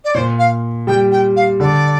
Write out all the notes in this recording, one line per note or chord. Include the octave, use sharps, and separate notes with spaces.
D5
A#2 C5
F5
G3 G5
G5
F5
D3 D5